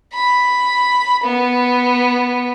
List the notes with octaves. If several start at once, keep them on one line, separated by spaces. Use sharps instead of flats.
B5
B3